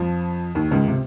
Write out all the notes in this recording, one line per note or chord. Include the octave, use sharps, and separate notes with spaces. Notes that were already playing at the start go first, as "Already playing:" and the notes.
Already playing: F2 F3
D#2 D#3
C#2 C#3
C3